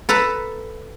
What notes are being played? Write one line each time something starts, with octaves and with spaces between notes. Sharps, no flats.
A4 B4 A5 A#5